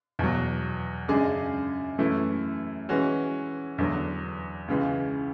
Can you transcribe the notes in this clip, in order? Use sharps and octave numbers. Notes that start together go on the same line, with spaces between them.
E2 B2 F#3
F#2 C#3 G#3 D4 G#4
F#2 E3 A3 E4
E3 G#3 C#4 F#4
E2 D3 F#3
C#2 C#3 E3 G#3